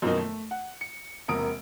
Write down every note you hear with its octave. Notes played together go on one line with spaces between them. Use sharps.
F#2 B2 D#3 F3 A#3 D#4
A3
F#5
C#7
E1 C3 A#3 A#4 D#6 D7